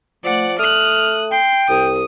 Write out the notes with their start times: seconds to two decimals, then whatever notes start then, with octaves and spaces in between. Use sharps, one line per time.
0.24 F3 A3 D5 F#5
0.59 A3 D#6 F6 F#6
1.32 G5 C6
1.70 C2 D#6